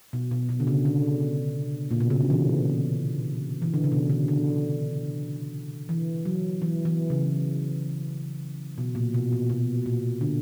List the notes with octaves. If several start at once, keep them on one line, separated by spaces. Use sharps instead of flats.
B2
B2
B2
D3
C#3
D3
A#2
B2
C#3
D3
E3
E3
D3
C#3
B2
D3
D3
E3
F#3
E3
E3
C#3
B2
A#2
B2
A#2
B2
A#2
D3